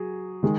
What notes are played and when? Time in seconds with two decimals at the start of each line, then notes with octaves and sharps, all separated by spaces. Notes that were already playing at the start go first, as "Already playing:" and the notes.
Already playing: F#3 G#4
0.43 D#3 G#3